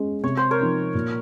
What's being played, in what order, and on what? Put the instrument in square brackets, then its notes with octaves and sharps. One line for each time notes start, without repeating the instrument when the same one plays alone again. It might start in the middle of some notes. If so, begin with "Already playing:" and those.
Already playing: [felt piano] G#3 C#4
[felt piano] C3 [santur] C#5
[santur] C5
A#4 C#5
[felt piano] F3 C4 D#4
A#2